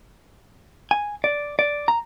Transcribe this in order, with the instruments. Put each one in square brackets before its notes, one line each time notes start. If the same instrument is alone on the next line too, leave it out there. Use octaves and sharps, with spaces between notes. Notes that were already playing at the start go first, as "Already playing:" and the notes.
[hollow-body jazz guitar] G#5
D5
D5
A#5